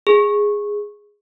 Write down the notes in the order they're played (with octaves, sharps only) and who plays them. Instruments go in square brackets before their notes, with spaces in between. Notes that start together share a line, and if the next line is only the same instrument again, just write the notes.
[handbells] G#4